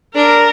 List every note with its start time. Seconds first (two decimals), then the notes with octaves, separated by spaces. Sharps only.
0.16 D4 A#4